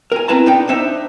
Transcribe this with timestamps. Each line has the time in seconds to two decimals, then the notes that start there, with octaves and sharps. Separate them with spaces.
0.12 A#4 G#5
0.28 C4 E4 B4 A5 A#5
0.46 D4 D#4 G5
0.69 D4 D#4 C5 E5